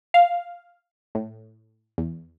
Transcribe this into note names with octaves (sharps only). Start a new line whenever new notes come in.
F5
A2
E2